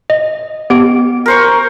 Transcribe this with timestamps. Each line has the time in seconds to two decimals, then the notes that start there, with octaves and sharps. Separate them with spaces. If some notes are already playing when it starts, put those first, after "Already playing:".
0.10 D#5
0.70 B3 G4 D7
1.26 A#4 C5 C#6